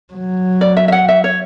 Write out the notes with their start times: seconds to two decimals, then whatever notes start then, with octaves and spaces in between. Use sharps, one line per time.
0.13 F#3
0.61 D5
0.77 E5
0.88 E5
0.92 F#5
1.08 E5
1.24 C#5